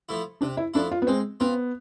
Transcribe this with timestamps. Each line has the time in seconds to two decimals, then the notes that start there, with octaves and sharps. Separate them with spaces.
0.09 F3 A3 E4
0.41 C3 D4
0.57 E4
0.74 F3 A3 D4 E4
0.91 F4
1.02 B3
1.07 G#3 C4
1.40 B3 C4 F4